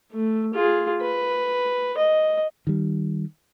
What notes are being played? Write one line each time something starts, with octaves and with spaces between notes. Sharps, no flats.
A3
F4 G#4
B4
D#5
D#3 G3